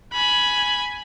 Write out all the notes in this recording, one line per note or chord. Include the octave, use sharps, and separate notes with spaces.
G#5 B5